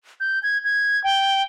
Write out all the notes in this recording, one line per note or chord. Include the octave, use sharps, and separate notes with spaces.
G6
G#6
G#6
G5